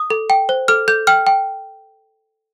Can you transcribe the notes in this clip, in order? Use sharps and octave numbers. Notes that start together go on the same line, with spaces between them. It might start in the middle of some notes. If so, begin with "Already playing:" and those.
Already playing: D#6
A4
G5
C5
A4 F6
A4 G6
G5 F6
G5